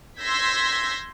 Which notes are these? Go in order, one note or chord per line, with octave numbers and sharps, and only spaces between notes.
C6 E6 G6 G#6 A#6 B6